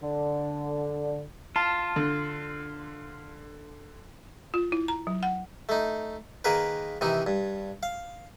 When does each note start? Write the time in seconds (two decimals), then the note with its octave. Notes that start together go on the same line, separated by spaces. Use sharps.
0.02 D3
1.56 F4 A5
1.96 D3
4.54 F4
4.72 E4
4.88 A#5
5.07 F#3
5.23 F#5
5.69 A3 D#4
6.44 D#3 A#3 G#4 A#4 B4
7.01 C3 D#3 E3 D#4
7.27 G2
7.83 F5